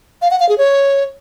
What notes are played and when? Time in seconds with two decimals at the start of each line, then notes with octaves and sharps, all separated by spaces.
0.22 F5
0.31 F#5
0.40 F5
0.49 G#4
0.58 C#5